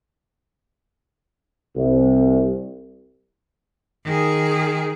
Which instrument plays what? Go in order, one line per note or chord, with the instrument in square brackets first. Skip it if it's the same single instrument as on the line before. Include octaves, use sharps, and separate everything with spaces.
[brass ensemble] C2
[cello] D#3 G#4